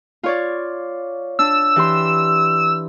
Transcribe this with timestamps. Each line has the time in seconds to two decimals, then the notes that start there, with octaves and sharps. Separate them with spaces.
0.23 F4 C#5 D5
1.39 D4 E6
1.76 E3 G4 C6